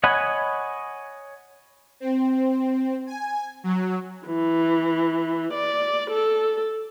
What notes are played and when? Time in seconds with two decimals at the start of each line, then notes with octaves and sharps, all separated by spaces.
0.04 C#5 D#5 F#5 G#5 B5
2.00 C4
3.07 G#5
3.64 F#3
4.26 E3
5.53 D5
6.09 A4